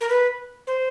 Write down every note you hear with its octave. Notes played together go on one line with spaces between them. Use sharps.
A#4
B4
C5